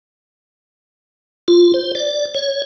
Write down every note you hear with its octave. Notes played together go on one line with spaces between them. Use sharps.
F4
C5
D5
C#5